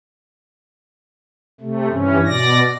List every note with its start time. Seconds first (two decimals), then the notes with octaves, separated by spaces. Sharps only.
1.61 C3 A3
1.91 G2 E3 C#4
2.26 B2 D5 A#6